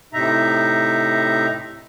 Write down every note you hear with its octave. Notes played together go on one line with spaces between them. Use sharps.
A2 C3 D#4 E5 A#5